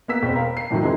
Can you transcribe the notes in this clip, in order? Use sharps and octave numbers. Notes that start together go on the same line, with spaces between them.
A#3 B3 E6 B6
E1 C4
A#4 F5
C7
F2 A2 C3 D#3 F#3
D#3 G#3 C4 E4